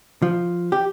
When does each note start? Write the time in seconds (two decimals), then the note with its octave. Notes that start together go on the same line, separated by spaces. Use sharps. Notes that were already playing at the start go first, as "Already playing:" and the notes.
0.22 F3
0.72 G4